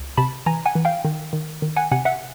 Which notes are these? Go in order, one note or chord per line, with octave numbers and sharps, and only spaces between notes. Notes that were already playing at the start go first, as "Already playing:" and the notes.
Already playing: C#2
C3 A5 B5
E3 G#5 A#5
F#5 G#5
E3
F5 G5
D#3
D#3
D#3
F#5 G#5
C3 F#5 G#5
E5 F#5